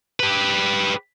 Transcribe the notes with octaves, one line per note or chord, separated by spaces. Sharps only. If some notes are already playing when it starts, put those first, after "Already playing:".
G4 B4